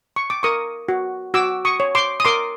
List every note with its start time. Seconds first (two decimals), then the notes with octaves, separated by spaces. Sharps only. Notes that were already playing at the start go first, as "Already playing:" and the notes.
0.16 C#6
0.30 D6
0.43 A#4 C#6 D#6
0.89 F#4
1.34 F#4 D6 E6
1.65 C#6 D#6
1.80 C#5
1.95 C6 D6
2.20 D#6
2.25 A#4 C6 D6